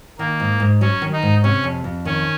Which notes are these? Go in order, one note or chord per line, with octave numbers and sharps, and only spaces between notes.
D#3 A#3
G#2
G#2
F#3 C#4
D#3
D#4
G#2
C3 C#4
F2
F2
D#3 C#4